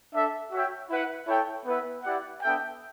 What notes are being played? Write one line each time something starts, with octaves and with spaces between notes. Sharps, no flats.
D4 A4 E5
F#4 C#5 E5 G5
E4 B4 F#5
E4 A4 C#5 G5
B3 E4 B4 E5
E4 G4 D5 F#5
B3 D4 A4 E5 G5